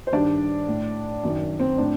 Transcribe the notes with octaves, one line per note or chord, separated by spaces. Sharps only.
C5
G2 D#3 D4 D5
A2
F#2 D#3
C4
A2 D4